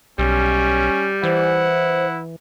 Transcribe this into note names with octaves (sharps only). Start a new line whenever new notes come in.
B1 G3 C#4
E3 E4 C5 F#5